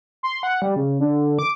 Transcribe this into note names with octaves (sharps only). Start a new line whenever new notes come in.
C6
F#5
G3
C#3
D3
D6